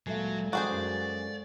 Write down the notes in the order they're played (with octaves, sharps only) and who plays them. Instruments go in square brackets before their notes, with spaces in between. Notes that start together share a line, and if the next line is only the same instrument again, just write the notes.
[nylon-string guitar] D2 A#2 E5 [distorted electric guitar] F#3 [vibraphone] G#3 A4 F5
[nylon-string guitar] D#3 F3 C4 [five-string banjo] F#4 G#4 C5 [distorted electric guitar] D5
[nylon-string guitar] F#2 C#4